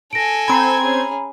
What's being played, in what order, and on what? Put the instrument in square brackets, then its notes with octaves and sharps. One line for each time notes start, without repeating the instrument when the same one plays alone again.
[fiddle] A4 G#5 [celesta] A#6 D7
[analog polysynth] C4 G#6 [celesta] A#5 B5
[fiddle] C#4 G#4